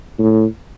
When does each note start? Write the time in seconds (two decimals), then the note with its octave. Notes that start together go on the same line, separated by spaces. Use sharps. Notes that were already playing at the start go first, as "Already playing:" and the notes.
0.19 A2